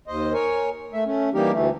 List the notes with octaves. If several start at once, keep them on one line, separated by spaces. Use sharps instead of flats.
D#2 C5 D#5
A#4 C#5 G#5
A3 E5
A3 C#4
E3 G3 A#3 D#4 G4 A#4
D2 E3 A3